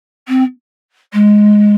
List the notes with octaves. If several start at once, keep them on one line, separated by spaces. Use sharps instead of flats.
C4
G#3